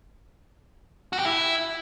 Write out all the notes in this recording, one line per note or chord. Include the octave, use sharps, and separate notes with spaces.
F#4
G4
E4